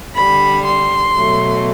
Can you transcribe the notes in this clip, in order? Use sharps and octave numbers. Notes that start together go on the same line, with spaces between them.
D3 G3 B5
C6
B2 F#3 A3